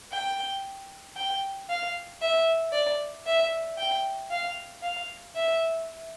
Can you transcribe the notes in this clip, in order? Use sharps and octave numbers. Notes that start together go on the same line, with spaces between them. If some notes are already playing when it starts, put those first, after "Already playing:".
G5
G5
F5
E5
D5
E5
G5
F5
F5
E5